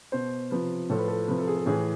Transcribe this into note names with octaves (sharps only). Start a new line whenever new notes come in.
B2 C5
C3 F3 B4
A2 F3 A4
B4
A4
C3 F3 B4
A4
G#4
A4
A2 E3 G#4